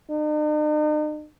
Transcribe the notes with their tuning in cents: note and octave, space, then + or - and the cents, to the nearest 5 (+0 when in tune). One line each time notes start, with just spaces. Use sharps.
D#4 -45